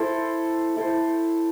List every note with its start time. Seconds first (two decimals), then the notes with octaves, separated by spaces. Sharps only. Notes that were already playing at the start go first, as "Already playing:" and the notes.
Already playing: E4 A4 C5
0.76 E4 A4 C5